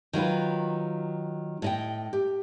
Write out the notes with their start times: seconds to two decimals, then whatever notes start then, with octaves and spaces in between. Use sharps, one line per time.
0.13 D#3 F#3 F4 B4
1.62 A2 D#5 G5
2.13 G4